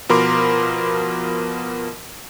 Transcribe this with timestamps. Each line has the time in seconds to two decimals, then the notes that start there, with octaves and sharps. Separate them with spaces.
0.09 B2 F3 A#4 B5 C6 D6